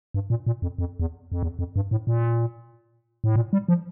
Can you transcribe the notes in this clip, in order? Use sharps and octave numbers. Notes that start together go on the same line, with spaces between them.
G2
A#2
A#2
F2
F2
E2
F2
E2
F2
G2
A2
A#2
A2
A#2
G3
F3